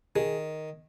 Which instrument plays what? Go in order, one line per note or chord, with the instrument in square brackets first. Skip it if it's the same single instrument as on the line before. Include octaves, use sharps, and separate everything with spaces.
[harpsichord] D#3 [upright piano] G#4